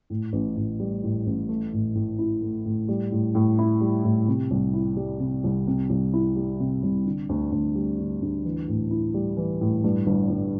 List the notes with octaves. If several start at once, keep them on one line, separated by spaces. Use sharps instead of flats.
A2
A1
A1
G3
A2
A1
A3
A2
A2
E4
A3
A2
G3
A2
A2
E4
G3
A2
C3
C2
E4
G3
C3
C2
C3
C2
E4
G3
C3
C2
D3
D2
D2
G3
D3
D2
E3
A2
E4
G3
E3
A2
G2
G1
G1